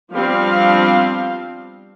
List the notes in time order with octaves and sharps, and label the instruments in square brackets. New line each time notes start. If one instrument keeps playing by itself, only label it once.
[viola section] F3 G3 B3 C4 D4 F5